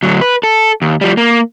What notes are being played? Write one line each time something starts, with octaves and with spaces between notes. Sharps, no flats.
D2 F#3
B4
A4
D#2
F3 G3
A#3